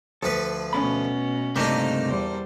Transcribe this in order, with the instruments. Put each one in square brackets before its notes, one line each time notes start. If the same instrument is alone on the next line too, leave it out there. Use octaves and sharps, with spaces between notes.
[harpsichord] D2 F3 B4 [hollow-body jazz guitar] A4
[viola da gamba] B2 C#4 [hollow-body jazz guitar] A3 B3 B5
[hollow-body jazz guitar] C#2 G2 C3 [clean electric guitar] A3 C4 D#4 [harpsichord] A#3 D4
[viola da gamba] E2 G3 C5